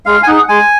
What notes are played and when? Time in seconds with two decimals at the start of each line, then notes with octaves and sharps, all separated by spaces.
0.06 G#3 F5
0.23 G#5
0.27 D#4 G#4 F#5
0.49 G#3 G#5